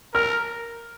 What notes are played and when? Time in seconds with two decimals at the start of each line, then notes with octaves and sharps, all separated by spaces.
0.14 A#4 F6